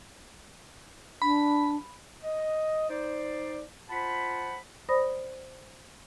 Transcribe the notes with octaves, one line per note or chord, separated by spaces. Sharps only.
D4 B5
D#5
D#4 C5 D5
F4 C5 F#5 A5 B5
C5 D5 B5 D#6 A#6